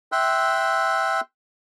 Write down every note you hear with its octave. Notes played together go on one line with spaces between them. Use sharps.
E5 G5 C6 E6 F#6